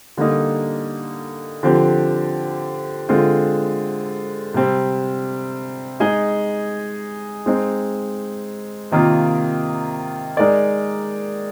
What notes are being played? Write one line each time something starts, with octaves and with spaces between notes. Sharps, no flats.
D3 G3 A#3 D#4
D3 F3 C4 G4
D3 G#3 C4 F4
C3 G3 C4
G#3 D#4 G#4 D#5
G#3 C4 D#4
C3 D#3 A#3 F4
G#3 D#4 A#4 D5